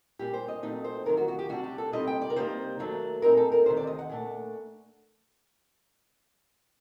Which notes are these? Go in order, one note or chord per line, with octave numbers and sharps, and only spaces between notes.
A#2 G3 D4 G4
C5
D#5
A#2 F#3 A3 C4 D#4 D#5
C5
D2 C3 D#3 F#3 A#4
F#4
F#4
G4
C3 G3 D4 F#4
G4
A4
C3 G3 C4 D#4 D#5
G5
D5
A#4
C3 G3 A#3 D#4 C5
D#2 D#3 F#3 A3 D4
A#2 G3 C4 D#4 A#4
A4
A#4
D2 C3 D#3 C5
D5
D#5
F#5
A#2 A3 D4